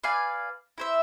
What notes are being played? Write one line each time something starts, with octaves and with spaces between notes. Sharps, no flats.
B4 D5 F5 G#5
E4 C5 E5